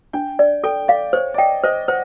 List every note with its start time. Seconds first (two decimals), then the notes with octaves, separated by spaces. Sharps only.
0.13 D4 G5
0.39 D5
0.64 A4 G5
0.88 D5 F5
1.13 C5 C#5
1.34 D5
1.38 D#5 G5
1.63 C5 D#5
1.88 C5 F#5